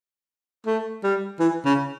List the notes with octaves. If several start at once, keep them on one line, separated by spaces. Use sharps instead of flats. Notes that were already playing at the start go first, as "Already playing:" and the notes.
A3
G3
E3
C#3